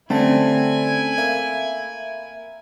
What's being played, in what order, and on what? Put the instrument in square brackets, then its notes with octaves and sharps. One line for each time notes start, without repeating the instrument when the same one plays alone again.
[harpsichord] D3 G3 [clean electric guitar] A3 C4 [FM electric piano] C#4 A5 [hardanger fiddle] E4 G#5
[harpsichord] A#3 [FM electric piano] E5